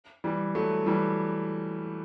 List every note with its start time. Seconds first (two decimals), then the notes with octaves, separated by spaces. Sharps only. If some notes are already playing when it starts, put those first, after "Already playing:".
0.24 E3 G3
0.55 F#3 A3
0.86 E3 G3